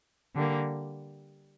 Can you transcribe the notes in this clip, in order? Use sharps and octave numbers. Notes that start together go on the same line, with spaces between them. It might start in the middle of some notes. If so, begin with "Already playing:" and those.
D3 G3 A#3